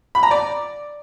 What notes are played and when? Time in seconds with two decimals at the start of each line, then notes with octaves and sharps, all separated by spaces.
0.15 B5
0.23 A#5
0.31 D5